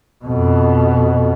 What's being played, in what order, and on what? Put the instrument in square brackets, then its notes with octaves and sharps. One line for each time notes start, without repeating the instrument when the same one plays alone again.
[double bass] F2 B2